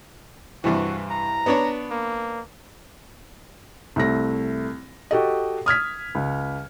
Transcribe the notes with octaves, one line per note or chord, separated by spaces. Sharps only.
G2 C3 E3 F#4
A#5
B3 D4 C#5
A#3
C2 A3 A#6
F#4 G4 A4 D#5
D#6 F6 G#6 B6
C#2